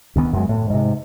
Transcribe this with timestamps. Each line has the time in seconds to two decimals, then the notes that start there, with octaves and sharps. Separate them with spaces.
0.16 D2 D#3 B3
0.33 F#2 F#3 G#3
0.49 A2
0.70 G#2 C3